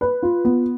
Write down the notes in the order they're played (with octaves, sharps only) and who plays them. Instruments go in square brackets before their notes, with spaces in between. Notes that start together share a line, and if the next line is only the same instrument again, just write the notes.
[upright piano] B4
F4
B3